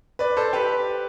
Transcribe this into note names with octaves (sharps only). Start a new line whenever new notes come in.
B4 D5
A4 C5
G4 B4